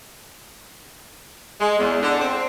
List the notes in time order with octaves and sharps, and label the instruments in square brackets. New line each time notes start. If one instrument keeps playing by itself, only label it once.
[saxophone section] G#3
E2
D3
C4